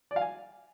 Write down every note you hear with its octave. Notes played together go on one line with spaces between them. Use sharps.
D5
F5
G#5